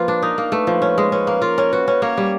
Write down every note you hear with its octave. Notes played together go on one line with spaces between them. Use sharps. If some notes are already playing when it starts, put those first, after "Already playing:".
Already playing: F3 A#3 F4 B4
D4
D#4 A#4
A#3
A3 B4
F3
C#4
G#3
C#4 B4
A#3
F4 A#4
C#4
F#4 B4
C#4
A#3 C#5
G3